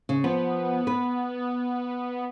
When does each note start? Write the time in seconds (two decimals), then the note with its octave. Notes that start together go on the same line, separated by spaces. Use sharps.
0.09 C#3
0.24 F3 B3
0.87 B4